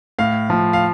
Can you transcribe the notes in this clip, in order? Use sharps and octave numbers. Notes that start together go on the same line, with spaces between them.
A2 F5
F3
F5